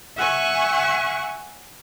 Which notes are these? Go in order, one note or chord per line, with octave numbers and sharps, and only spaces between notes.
E5 F#5 G#5 C#6